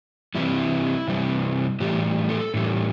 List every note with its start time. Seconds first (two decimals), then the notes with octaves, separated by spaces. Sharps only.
0.35 C3 E3 G3 E4
1.08 C3 E3 G3
1.80 A2 E3 G3 G4
2.29 A4
2.54 A2 E3 G3